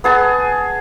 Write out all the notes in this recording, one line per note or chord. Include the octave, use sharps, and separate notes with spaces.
B3 G#4 A5